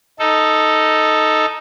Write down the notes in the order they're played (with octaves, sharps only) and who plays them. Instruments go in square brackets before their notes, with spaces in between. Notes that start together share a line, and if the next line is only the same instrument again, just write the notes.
[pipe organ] D#4 A4